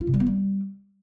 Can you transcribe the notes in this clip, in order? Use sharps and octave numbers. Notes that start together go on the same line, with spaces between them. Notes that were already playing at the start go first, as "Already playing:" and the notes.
F4
C3
G3
B3
G3